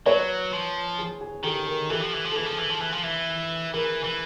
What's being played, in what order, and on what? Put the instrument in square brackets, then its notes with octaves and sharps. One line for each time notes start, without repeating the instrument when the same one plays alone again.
[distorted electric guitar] F#3 [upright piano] B4 C#5
[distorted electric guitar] F3
[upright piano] G#4
G#4
[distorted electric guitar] D#3 [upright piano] G4 A4
[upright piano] G#4 A#4
[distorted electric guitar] E3 [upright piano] G4 A4
[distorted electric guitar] F3
E3
F3
[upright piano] A4
[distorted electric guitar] E3 [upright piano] G#4
[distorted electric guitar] F3
E3
F3
E3
F3
E3
[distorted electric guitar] E3 [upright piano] G#4 A#4
[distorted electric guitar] E3